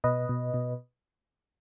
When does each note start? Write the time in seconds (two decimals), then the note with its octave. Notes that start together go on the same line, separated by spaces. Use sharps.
0.04 B2 B4 D#5
0.29 B2
0.54 B2